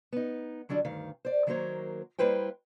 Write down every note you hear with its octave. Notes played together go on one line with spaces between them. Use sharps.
B3 D#4
D3 F#3 G3 D4 E4
D2 G2 D#3 F5
C5 D5
D#3 F#3 A#3 A#4 C5 C#5
G3 A#3 E4 B4 C5 G5